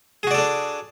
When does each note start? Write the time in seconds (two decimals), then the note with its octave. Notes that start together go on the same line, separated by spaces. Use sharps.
0.23 G#4
0.27 F#4
0.31 D5
0.35 A4
0.38 D4